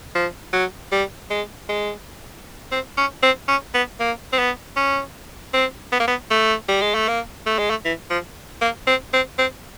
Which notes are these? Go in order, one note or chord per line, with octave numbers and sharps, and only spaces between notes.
F3
F#3
G3
G#3
G#3
C4
C#4
C4
C#4
B3
A#3
C4
B3
C#4
C4
B3
A#3
B3
A3
G3
G#3
A3
A#3
A3
G#3
A3
E3
F3
A#3
C4
C4
C4